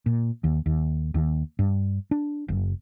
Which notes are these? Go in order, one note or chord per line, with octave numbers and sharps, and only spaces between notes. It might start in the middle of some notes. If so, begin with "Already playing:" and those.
A#2
D#2
D#2
D#2
G2
D4
F#1